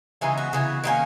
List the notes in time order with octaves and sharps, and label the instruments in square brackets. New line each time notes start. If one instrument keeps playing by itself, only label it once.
[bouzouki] C#3 E3 G#3 B3 D#4
F#4
C#3 E3 B3
D#3 F#3 A#3 C#4